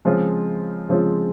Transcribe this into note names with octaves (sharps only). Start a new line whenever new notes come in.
C#3 F3 G#3 C4 F4
C#3 F3 G#3 C4 F4